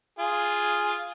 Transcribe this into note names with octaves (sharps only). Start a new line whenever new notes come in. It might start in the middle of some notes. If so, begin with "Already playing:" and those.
F4 G#4